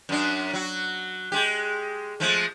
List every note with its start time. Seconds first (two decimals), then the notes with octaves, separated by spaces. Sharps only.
0.09 F#2 D4
0.53 F#3 F#4
1.32 G#3 G4
2.20 F3 G#3 A3